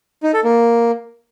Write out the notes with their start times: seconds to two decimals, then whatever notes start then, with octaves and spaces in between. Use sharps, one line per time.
0.23 D#4
0.33 A4
0.44 A#3